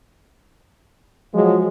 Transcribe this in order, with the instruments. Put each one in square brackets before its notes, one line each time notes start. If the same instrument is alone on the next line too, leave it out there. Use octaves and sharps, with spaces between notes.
[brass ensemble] F3 F#3 [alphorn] G#3